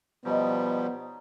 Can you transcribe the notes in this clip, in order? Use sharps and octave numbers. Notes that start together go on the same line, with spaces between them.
B2 F3 G3 B3 D#4 C#5 D#5